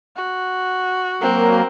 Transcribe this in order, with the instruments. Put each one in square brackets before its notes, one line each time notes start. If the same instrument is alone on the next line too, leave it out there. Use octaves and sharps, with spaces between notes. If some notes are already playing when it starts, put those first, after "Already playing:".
[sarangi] F#4
[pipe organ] F#3 A#3 [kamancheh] C4 A#4